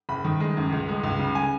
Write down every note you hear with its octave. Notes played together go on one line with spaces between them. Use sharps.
F#1 B5
D#3
G#3
F#2
C#2
G#3
C#2
C#3
G#5